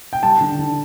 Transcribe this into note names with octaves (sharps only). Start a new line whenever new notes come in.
G5
G3 A5
D3
D3